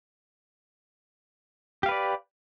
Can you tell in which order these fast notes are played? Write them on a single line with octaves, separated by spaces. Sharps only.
G4 F5 B4 D5